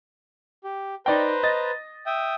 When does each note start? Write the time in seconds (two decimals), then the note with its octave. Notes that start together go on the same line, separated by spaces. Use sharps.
0.64 G4
1.06 D#4 B4 C5 D5 G5 A#5
1.43 D#5 A6
2.06 E5 G5 D#6